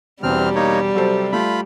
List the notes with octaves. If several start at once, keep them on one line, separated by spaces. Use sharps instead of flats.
E1 E2 G3 C4 F6
A#3 D#4 C#5
C3 F#3 A4 C5
A3 F4 B5